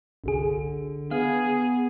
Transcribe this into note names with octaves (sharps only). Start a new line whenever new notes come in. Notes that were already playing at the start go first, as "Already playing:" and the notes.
G1 C2 D3 G#4
B3 G#4 F5